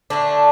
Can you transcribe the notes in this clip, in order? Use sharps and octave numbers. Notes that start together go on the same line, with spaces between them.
D3 A3 D4